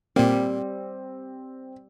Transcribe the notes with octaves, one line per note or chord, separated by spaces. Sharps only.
A#2 G3 A#3 C4